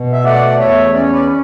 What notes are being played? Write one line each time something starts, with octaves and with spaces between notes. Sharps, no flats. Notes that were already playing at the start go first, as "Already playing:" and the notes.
Already playing: B2
E5
A3 D5 F#5
E2 C#5 E5
C#4 D5
C#5
B4 D5